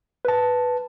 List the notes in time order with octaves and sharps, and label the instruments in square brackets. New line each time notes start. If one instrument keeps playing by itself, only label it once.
[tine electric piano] B4 A5